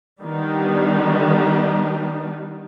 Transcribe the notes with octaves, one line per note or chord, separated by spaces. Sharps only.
D#3 G3 B3 D4 D#4